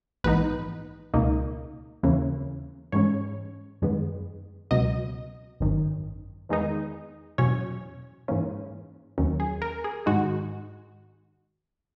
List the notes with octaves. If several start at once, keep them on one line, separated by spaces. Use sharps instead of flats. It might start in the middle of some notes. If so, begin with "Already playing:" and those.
A#1 G#2 E3 B3 D#4 B4
C#2 B2 A#3 D#4
D#2 C#3 E3 A#3 C#4
G#2 E3 G#3 C#4 C#5
F#2 D#3 G#3 B3
C#2 B2 F#3 D#5
G#1 F#2 D#3
E2 D#3 G#3 B3 D#4
E2 B2 F#3 C#4 C#5
G#2 E3 A#3 C#4
D#2 D#3 F#3 C#4
G#4
A#4
G#4
G#2 D#3 G#3 D#4 F#4